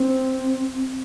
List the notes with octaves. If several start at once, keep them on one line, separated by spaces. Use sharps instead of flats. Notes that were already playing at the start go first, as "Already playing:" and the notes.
Already playing: C4